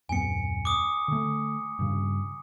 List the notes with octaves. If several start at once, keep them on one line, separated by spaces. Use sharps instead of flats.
D#1 F#2 B3 G#5 C#7
D6 D#6
D3 A3
G2 C#3